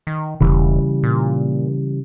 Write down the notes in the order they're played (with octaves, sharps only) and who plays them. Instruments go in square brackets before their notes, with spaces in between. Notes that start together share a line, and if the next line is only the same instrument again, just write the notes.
[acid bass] D#3
[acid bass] E1 [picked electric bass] C#3 E3 G3
[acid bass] A#2